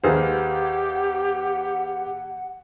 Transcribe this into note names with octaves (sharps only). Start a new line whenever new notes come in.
D#2 G4 G#4 B4 C5 F5 F#5